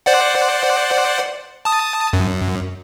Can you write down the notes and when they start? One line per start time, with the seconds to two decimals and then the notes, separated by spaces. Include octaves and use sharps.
0.06 C5 D5 F#5
1.65 A5 D#6
2.13 F#2